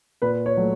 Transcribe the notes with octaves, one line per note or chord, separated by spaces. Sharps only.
A#2 B4
C#5
F#3 A3